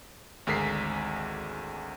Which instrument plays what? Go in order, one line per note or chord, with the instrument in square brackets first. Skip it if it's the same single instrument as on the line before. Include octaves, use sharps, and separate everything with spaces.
[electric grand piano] G#1 D2 G#3 A#4 B6 C7